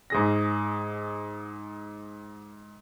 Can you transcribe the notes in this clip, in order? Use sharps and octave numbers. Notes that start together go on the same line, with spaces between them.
G#2 G#4 A#6